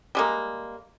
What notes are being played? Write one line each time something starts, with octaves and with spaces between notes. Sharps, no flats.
G3 G#3 A#3